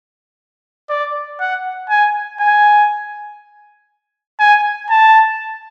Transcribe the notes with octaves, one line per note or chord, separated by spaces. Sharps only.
D5
F#5
G#5
G#5
G#5
A5